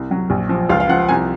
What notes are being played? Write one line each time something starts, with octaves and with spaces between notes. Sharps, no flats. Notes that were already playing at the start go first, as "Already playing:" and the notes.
Already playing: C2
F#3
A#1
F3
C#2 F5
F5
F3 F#5
C2 G#5